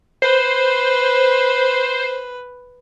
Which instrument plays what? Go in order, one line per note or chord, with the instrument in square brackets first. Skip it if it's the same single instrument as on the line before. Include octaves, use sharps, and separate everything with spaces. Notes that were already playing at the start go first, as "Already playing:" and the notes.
[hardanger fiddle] B4 [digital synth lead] C5